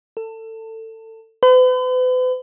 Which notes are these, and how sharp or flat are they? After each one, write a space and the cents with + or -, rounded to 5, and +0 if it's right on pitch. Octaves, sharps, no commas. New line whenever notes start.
A4 +25
B4 +45